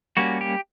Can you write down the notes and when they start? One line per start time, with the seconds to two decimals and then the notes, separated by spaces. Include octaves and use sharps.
0.17 G3 A#3 C#4 F#4
0.41 G4